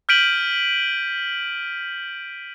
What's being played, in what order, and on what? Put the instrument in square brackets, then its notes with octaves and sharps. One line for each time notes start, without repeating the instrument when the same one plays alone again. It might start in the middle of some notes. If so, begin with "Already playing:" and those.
[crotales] F6 G6 B6 D7 D#7 F#7